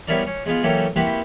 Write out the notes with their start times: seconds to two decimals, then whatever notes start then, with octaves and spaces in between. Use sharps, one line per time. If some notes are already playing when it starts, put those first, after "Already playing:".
0.08 G3 B3 C#4 E4 A#4 D5
0.27 C#4
0.46 G#3 B3 F4
0.63 E3 F#3 A#3 C#4 G4 A4
0.96 A#3 C4 E4 F#4 G4 B4